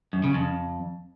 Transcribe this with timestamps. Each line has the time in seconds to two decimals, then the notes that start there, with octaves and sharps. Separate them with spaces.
0.13 F#2
0.24 C#3
0.34 F2